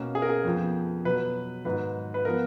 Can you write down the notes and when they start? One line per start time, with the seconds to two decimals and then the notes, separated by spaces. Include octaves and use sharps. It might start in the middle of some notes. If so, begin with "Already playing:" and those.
Already playing: B2 A#3 C#4
0.15 G#4
0.22 A#4
0.29 G#4
0.45 F2 F3 B3
1.05 B2 F#3 B3 B4
1.65 G#2 D#3 F#3 B4
2.14 B4
2.25 F3 B3 A#4